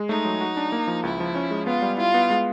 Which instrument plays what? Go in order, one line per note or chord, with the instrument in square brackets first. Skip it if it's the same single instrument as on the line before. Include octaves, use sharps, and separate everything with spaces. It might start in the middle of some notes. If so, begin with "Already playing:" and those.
Already playing: [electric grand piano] G#3
[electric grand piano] A3 [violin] D#4
[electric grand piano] F#3
F#4
D4
A#3
F3
[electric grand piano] C#2 [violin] E4
[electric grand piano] F3
C#4
G#3
[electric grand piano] B3 [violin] F4
[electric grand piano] G3
[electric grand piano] E4 [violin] F4
[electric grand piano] B3
G#3